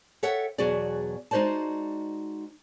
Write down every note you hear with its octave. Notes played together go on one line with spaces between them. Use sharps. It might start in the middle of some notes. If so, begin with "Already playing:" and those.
A4 C#5 E5 F#5 G5
E2 B2 F#3 F#4 G#4 D5
G#3 D#4 F#4 C5 D5 A5